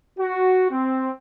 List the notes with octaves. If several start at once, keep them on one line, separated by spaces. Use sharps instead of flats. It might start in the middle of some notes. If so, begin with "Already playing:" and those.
F#4
C4